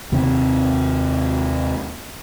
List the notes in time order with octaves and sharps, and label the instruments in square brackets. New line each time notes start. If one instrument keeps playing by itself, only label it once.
[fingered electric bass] D#2 C3 C4